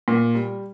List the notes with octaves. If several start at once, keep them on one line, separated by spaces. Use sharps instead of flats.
A#2
G3